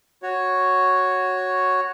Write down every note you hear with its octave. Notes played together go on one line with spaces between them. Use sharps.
F#4 C#5